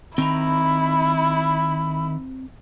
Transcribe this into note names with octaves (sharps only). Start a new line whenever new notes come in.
D#3 C4 E4 A#5 B5